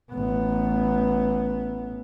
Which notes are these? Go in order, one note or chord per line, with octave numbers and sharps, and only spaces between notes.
A1 B3